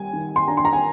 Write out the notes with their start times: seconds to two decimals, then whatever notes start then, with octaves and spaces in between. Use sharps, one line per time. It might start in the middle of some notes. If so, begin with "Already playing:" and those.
Already playing: G3 G#5
0.13 D#3
0.36 C6
0.48 D4 A#5
0.57 C6
0.65 A#5
0.73 G#5